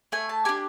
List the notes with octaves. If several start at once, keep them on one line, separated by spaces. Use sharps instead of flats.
A3 G#5
A5
D4 G4 G#5